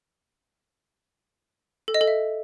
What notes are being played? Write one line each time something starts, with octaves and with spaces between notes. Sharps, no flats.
A4
D#5
A4
E5